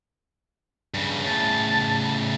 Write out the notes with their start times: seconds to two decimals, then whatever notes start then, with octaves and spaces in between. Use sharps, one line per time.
0.94 G2 C#3
1.24 A2 C#3 A5